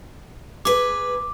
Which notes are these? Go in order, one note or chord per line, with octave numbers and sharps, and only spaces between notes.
G#4 B4 D6